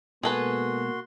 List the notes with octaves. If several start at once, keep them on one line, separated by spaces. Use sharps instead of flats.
B2 G#3 A#3 F#4 G#4 A4 B4 C6